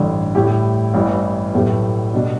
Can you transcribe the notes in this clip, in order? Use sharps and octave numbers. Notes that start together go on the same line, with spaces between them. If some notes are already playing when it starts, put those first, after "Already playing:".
Already playing: A1 G2 D3
A2 G3 E4 G4
A1 G2 E3
B1 A2 A3 G4 B4
B2 G3 D4